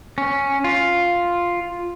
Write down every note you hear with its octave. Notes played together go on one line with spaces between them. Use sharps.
C#4
F4